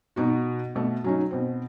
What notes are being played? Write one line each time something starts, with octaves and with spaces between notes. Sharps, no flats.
B2 D#4 F#4
B2 A3
F#3 C#4 D#4
B2 C4